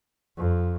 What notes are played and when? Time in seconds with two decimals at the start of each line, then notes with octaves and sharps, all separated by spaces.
0.38 F2